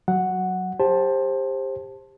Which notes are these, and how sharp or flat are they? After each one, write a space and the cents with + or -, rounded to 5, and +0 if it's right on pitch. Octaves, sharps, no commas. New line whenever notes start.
F#3 +0 F#5 +0
G4 +25 C5 +20 A5 +0